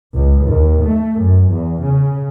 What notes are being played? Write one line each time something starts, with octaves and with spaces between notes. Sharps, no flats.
C#2
D#2
A3
F#2
E2
C#3